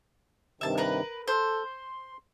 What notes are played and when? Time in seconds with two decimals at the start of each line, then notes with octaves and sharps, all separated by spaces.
0.61 G2 C3 D#3 E5 A5
0.78 A#4 B4
1.28 A4 C5
1.65 C6